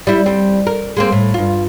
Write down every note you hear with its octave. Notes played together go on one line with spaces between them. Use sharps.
G3 E4
G3 C4
A#4
G#3 A#3 C4
A2
G2 F4